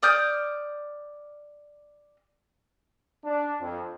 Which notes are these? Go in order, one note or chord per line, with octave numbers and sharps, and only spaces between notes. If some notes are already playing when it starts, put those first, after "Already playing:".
D5 D#6 F6 G6
D4
F2